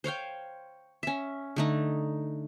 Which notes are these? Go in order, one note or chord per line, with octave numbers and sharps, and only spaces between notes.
C5 C#5 F5 G5
C#4 E5
D3 A3 D#4